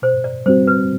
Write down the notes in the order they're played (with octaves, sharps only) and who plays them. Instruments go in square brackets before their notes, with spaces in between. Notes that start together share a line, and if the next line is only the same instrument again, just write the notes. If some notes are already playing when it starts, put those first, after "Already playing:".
[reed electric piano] B2 [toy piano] C5
[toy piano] D5
[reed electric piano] G3 C4 F#4 [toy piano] C5
[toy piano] B4